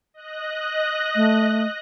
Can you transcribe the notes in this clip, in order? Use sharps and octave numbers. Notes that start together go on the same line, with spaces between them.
D#5 F#6 A#6
A3